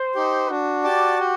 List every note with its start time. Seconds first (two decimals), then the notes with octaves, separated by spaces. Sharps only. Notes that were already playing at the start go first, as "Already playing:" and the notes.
Already playing: C5
0.15 D#4 G4
0.49 D4 F#4
0.84 G4 D5 A5
1.19 G4